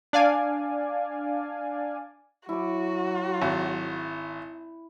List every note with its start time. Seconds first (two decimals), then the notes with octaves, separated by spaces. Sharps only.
0.13 D4 D5 F5 G#5
2.49 F#3 E4 F#4 D6
3.42 G#1